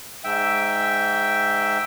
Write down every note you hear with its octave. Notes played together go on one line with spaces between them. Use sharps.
G#2 E5 G5